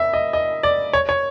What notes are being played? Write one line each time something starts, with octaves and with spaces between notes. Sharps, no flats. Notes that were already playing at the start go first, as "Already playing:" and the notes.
Already playing: E5
D#5
D#5
D5
C#5
C#5